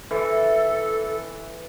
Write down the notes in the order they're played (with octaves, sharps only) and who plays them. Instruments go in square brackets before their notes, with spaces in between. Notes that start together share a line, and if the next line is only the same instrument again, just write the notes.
[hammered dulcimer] E3 [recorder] A4